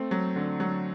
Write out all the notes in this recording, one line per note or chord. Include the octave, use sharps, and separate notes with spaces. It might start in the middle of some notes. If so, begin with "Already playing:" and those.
Already playing: A3 C4
F#3
D3
F#3